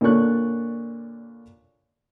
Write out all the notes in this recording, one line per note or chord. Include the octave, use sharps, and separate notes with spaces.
A#2 D3 C#5 D5 C#6 F#6